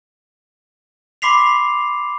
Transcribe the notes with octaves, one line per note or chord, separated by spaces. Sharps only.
B5 C6 D6 B6 C7 F7